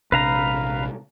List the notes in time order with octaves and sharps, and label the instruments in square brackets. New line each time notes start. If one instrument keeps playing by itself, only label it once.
[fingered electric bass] A#1 C3 D4 [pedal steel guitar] B4 F5 A#5